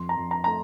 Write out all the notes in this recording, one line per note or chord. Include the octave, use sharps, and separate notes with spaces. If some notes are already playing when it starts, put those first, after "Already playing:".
Already playing: F2 C6
A#5
F2
A#5
A3 A#5